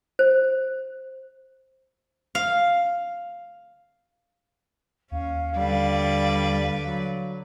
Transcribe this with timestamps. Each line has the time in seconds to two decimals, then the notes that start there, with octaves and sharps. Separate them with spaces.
0.19 C5
2.35 F5
5.11 D#2 C#4 F5
5.56 D3 G3 B4 D5
6.83 F#3